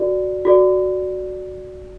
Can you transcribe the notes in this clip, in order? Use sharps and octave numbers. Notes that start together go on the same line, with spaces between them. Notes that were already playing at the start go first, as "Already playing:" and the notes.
Already playing: F#4 A4 D5
F#4 A4 D5